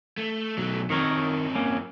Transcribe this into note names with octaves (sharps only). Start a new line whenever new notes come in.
A3
B1 F#3 A3
F#2 D#3 C4 A#4 C#5
A#3 C#4